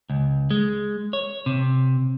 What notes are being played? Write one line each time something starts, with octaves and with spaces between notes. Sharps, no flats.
C#2
G#3
C#5
C3